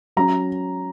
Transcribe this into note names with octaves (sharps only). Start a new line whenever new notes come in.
F#3 C#4 A#5